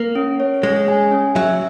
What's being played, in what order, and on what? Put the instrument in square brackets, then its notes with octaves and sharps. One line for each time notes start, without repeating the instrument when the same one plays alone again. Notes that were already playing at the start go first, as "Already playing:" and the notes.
Already playing: [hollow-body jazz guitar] A#3
[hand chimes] C#4
C#5
[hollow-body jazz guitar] G#3 [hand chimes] G#4
[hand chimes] G#5
C#4
[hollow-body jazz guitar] F#3 [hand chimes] E5